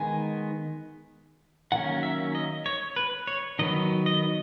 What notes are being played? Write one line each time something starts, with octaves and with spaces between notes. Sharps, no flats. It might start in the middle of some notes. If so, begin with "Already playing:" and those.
Already playing: D#3 G#3 B3 G#5
D#3 F#3 A#3 C#4 F#5
E5
D#5
C#5
B4
C#5
D#3 F#3 B3 D#5
D#5